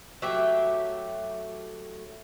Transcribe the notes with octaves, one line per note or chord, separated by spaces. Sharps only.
F#3 A3 G4 E5